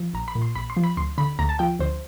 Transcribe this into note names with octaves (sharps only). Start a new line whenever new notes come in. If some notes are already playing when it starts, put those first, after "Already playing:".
Already playing: F3
A#1 A#5
B5
A#2
C6
A#1 B5
C6
F3
B5
D2 C6
D3 B5
D2 A#5
A5
F3 G5
D2 C5